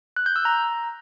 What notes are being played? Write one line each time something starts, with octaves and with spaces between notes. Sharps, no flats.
F#6
G6
E6
A#5